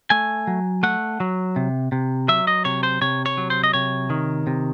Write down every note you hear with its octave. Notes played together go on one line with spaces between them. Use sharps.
A3 G#5
F#3
A3 F#5
F#3
C3
C3
F#3 E5
D#5
C3 C#5
C5
C3 C#5
C#5
F#3
C5
D#5
C3 C#5
D#3
C3